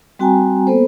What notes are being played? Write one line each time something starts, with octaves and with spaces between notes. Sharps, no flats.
G3 C4 F#4 G5 G#5 A#5
A#3 B3 A4 C5